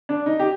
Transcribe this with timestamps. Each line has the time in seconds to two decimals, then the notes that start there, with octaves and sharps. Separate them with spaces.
0.09 D4
0.26 D#4
0.40 G4